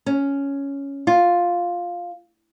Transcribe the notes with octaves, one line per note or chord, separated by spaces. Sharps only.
C#4
F4